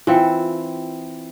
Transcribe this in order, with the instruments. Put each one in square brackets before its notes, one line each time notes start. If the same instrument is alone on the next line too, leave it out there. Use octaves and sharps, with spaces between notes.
[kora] E3 C4 [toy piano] F4 F5 G5